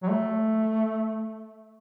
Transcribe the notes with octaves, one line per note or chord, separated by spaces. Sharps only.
F#3
A3